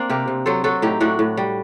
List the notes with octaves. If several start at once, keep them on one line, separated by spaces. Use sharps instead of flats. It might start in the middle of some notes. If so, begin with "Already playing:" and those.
Already playing: A#3 C4 D4
C3 G4 A#4
C3
F#3 A4 C5
F#3 F#4 A4
A2 D#4 G4
A2 D4 F#4
A2
G3